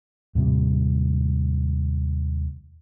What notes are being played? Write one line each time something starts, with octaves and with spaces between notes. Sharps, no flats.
D#2 A2 C3 G3